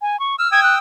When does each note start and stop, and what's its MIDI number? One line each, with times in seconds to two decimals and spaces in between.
0.02 0.19 80
0.20 0.36 85
0.39 0.51 88
0.39 0.51 89
0.52 0.79 79
0.52 0.79 87
0.52 0.79 88
0.52 0.63 92
0.63 0.75 90